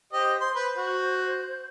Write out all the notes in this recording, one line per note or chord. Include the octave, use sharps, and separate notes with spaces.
G4 C5 D#5
C5 C6
B4 C5
F#4